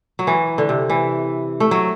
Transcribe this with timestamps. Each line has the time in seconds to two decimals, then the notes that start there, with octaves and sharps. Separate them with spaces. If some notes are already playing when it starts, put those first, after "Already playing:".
0.19 F#3
0.27 E3
0.58 D3
0.69 C3
0.90 E3
1.60 A3
1.71 F#3